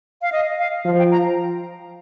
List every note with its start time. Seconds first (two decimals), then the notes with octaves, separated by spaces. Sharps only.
0.22 F5
0.32 D#5
0.59 F5
0.85 F3 F5
0.99 G5
1.11 A#5